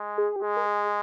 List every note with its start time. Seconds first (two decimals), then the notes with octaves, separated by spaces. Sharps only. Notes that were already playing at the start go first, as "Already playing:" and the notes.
Already playing: G#3
0.18 G#4
0.36 G4
0.42 G#3 G#4
0.57 A#4
0.66 G#4